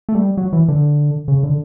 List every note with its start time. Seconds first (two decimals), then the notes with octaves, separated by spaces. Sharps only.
0.09 A3
0.15 G3
0.37 F#3
0.53 E3
0.68 D3
1.28 C#3
1.43 D3